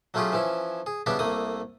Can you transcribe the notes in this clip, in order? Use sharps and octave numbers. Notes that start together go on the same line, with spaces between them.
F#3 A3 C#4 F4 G4 G#4
E3 F3 C#4 E4
G#4
C#3 G3 B3 D4 E4 G4
C2 A3 A#3 D#6